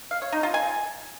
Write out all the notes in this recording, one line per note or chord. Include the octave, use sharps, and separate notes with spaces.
F5
C#5
D#4
F4
G#5